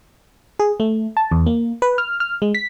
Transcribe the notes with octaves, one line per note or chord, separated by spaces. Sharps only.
G#4
A3
A5
E2
A#3
B4
F6
F6
G#3
B6